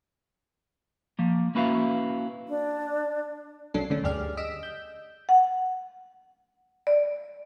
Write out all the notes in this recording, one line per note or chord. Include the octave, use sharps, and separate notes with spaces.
F3 A#3
A#3 C#4 E4 F#4 B4 F5
D4
B1 F#3 C#4 D4 A4 C7
D3 A3 C#4 D4
D2 G2 G4 G#4 D5 F6
D#5 E6 B6 D7 E7
G6
F#5
D5